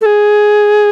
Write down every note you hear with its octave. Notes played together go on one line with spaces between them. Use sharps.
A4
G#4